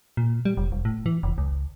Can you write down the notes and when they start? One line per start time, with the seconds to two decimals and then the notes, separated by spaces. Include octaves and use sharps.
0.17 A#2
0.45 G3
0.57 F1
0.72 E1
0.85 A2
1.06 E3
1.23 F1
1.38 C#2